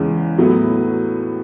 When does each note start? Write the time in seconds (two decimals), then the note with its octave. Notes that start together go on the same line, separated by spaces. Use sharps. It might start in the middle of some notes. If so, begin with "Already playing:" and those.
Already playing: E2 C#3 E3 G#3 C#4
0.38 A2 F#3 B3 E4